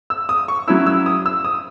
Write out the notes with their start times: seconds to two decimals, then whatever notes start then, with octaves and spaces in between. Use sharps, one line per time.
0.10 E6
0.29 D#6
0.48 C#6
0.68 F#3 C#4 E4 E6
0.86 E6
1.06 D#6
1.26 E6
1.45 D#6